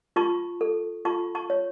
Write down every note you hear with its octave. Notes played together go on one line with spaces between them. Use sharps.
F4 A5 C#6
A4
F4 A5 C#6
A5 C#6
C#5